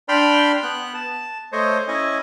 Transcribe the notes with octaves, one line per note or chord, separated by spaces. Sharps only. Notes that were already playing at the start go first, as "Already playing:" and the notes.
D4 D5 G5 B5 C6 F6
B3 F#6
A5
A3 C5 C#5 D#5
C#4 E4 D#5 G#5